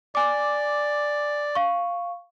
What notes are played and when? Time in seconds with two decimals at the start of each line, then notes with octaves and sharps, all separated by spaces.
0.15 D5 G#5 D6
1.55 F5 C#6